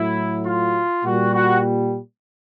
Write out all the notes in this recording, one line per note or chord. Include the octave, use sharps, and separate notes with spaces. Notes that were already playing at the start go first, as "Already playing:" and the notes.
Already playing: A2 F#3 E4
F4
A#2 G3 F#4
F#4